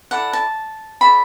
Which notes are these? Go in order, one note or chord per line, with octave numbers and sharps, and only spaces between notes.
E4 A4 D5 F#5
A5
F#4 A4 D5 B5